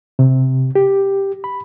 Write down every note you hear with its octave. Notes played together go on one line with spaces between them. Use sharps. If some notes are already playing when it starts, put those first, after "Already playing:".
C3
G4
B5